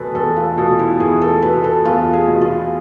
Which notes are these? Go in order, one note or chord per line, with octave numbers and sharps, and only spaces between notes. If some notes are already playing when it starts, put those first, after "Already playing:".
Already playing: E2 B2 A4 B4
E2 A4
F4
B2 A4
E4
E2 G#4
A4
B2 B4
A4
E2 F4
G#4
B2
F4